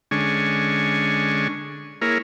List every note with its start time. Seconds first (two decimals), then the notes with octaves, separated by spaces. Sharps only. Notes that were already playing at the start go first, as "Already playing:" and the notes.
0.11 D3 G#3 C#4 D4 G#5 C#6
2.02 A#3 E4 G#4 A#4 C#5